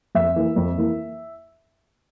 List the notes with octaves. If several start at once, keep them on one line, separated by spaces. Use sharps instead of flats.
F2 E5
E3 A#3 E4
F2
E3 A#3 E4